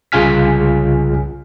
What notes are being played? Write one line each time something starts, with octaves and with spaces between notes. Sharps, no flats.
C2 C#3 F4 G#5 F6 B6